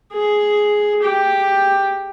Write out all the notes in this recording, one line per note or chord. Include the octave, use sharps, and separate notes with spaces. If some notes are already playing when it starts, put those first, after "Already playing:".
G#4
G4